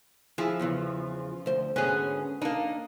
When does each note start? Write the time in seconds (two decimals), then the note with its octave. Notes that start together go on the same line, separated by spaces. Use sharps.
0.38 F3 E4 G#4
0.59 E2 C#3 E3
1.46 D2 C5
1.76 D2 G#2 B3 C#4 G#4
2.42 A#3 D4 D#4